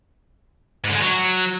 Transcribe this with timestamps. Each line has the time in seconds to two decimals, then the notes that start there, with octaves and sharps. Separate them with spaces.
0.84 G#2
0.90 D3
0.95 G#3
1.00 F#3